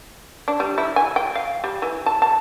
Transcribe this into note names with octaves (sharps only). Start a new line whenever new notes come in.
D4
G3
E4
G#5
G5
F5
G3
E3
A5
A5